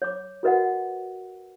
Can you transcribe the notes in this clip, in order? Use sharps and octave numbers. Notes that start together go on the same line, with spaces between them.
C#5 D6
F#4 A#4 B4 D#5 F#5